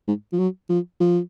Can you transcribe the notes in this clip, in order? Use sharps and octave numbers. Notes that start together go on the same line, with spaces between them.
G#2
F3
F#3
F3
F3